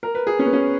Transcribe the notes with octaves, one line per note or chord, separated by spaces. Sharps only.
A#4
B4
G#4
C#4
B3
C#4